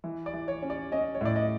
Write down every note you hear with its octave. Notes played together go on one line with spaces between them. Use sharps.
E3
D5
E3
C#5
C#4
D5
C#4 D#5
C#5
A2 D5
D#5